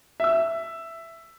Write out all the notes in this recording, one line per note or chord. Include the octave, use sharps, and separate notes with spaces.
E5 E6